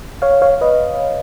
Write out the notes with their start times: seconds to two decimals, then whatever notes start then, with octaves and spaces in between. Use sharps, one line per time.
0.22 C#5 F5
0.42 C#5 F5
0.61 B4 D#5